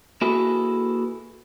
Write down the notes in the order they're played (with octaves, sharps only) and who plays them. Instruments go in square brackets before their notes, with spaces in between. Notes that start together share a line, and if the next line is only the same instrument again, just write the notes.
[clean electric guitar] A#3 E4 F#4 G#4 A4 B4